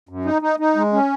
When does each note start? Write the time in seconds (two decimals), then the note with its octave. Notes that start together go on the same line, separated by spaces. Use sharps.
0.09 F#2
0.25 D#4
0.42 D#4
0.60 D#4
0.76 G#3
0.93 C#4